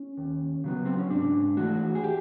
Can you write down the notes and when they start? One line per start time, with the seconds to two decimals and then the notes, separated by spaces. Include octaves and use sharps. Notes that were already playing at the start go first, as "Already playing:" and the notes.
Already playing: C#4
0.18 D#2
0.64 C#3 F#3 B3
0.85 C4
0.98 C#4
1.10 G#2 D4
1.57 E3 A3 F#4
1.95 G#4
2.04 G4